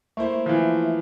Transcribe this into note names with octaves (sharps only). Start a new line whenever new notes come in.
A3 A#3 E4 C5
E3 F3